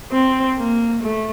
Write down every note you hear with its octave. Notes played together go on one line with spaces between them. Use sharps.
C4
A#3
A3